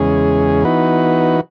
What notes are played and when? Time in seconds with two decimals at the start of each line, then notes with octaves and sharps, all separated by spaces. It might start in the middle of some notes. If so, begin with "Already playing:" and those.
Already playing: E2 C#3 G#3 C#4 G#4
0.64 E3 B3 D#4 F#4 B4